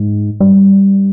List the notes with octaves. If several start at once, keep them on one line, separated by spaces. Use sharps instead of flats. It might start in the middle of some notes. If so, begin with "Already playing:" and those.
Already playing: G#2
G2